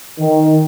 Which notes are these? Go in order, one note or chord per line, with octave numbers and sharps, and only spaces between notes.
D#3